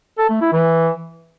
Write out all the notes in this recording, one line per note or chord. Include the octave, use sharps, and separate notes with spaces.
A4
A3
E4
E3